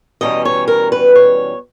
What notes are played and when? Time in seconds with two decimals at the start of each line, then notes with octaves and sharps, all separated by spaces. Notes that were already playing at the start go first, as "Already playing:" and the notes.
0.21 E2 B2 G3 C#4 D#5
0.45 C#5
0.68 A#4
0.92 B4
1.15 C#5